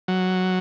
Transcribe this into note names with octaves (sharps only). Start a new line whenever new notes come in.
F#3